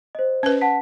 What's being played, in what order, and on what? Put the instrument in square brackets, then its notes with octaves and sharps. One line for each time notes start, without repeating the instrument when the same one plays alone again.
[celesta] C5 D#5
[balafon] C#4 B4
[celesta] F#5 A5 B6